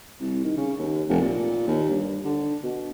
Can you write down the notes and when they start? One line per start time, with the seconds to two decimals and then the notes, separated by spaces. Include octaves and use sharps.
0.21 C2
0.44 D#3
0.57 C#3
0.79 D#2
1.09 F1
1.22 A#2
1.67 D#2
1.89 G2
2.24 D3
2.64 B2